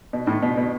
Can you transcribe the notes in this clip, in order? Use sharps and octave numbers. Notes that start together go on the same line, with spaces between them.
B2
A2
B2
B2